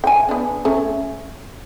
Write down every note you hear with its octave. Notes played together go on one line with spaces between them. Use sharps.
G5 G#5
B3 D4
A3 C#4